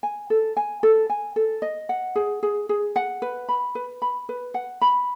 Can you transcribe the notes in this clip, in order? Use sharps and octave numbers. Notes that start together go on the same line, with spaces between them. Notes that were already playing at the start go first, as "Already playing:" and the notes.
G#5
A4
G#5
A4
G#5
A4
D#5
F#5
G#4
G#4
G#4
F#5
B4
B5
B4
B5
B4
F#5
B5